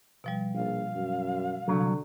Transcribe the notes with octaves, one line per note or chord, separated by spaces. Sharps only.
B2 F3 G3
A#1 F5
F#2
C2 G2 D3 F#3